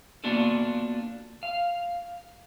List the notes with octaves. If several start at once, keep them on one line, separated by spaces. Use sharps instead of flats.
A#3 B3 D4 F4 F#4 A4
F5